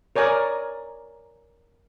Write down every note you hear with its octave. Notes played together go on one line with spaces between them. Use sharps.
A#4 C#5 D5 G#5 A#5